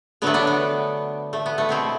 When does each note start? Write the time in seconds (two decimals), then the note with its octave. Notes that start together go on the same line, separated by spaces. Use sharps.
0.22 D3 F#3 A3 B3
0.34 B3 D4
0.47 B3
1.33 A3
1.46 B3
1.58 A3
1.69 B2 A3 C4 E4